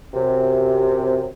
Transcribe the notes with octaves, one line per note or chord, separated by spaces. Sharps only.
F#2 C3